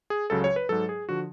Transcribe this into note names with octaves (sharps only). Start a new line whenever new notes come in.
G#4
C#2 C#3 F#3 A4
C#5
B4
G#2 F#3 A4
G#4
D3 F3 F#4